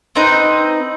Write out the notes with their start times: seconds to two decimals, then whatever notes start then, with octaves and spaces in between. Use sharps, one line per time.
0.16 C4 D#4 B4